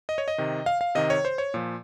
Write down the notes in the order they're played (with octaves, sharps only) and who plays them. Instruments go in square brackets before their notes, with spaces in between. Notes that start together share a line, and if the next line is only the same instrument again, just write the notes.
[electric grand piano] D#5
C#5
D#5
C3 D#3
F5
F5
C3 D#3 D#5
C#5
C5
C#5
A#2 F3